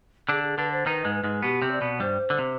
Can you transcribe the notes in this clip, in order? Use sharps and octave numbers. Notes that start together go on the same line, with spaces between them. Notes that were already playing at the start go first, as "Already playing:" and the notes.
D3 D4 G#4
G#4
D3 D4 B4
C5
D#3 D#4 B4
G#2 G#3
B4
G#2 G#3
B2 B3 G4
C3 C4
D5
B2 B3
G2 G3 C5
D3
C3